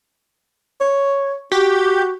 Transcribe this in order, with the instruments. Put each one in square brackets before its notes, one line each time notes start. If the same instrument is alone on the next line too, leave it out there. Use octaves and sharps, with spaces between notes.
[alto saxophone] C#5
[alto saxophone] F#4 [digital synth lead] G4